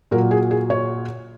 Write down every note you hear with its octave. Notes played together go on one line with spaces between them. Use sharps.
A#2 F#3 A#4
G#4
G#4
C#5